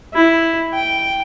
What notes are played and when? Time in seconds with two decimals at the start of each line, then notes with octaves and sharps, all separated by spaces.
0.14 E4
0.74 G5